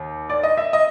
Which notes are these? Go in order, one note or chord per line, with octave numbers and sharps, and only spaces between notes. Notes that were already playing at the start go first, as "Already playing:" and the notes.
Already playing: D#2
D5
D#5
E5
D#5